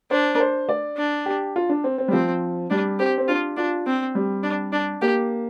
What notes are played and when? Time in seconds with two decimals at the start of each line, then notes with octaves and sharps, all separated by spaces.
0.11 D4 C5
0.35 A#4
0.40 C5
0.69 D5
0.98 D4
1.26 G4
1.56 F4
1.69 D4
1.84 C4
1.98 C4
2.08 G3
2.13 F3 C4
2.71 G3 D4
2.99 C4 G4
3.18 C4
3.28 D4 F4
3.58 D4 F4
3.87 C4
4.15 G3
4.44 D4
4.73 D4
5.02 A#3 G4